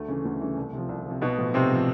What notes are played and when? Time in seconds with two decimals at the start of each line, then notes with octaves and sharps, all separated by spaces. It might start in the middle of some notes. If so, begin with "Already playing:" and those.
Already playing: D2 A3
0.08 C#3 E3
0.25 D2
0.41 C#3 E3
0.57 C2
0.73 C3 F3
0.89 C2
1.06 C3 F3
1.22 B1 B2 B3
1.38 A2 F3
1.54 B1 C3 C4
1.70 A2 F3